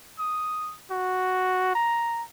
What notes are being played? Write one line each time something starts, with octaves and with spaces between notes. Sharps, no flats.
D#6
F#4
A#5